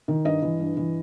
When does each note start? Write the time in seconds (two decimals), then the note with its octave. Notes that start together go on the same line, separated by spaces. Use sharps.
0.08 D#3
0.25 G2 D#5
0.42 E3
0.60 G2
0.77 E3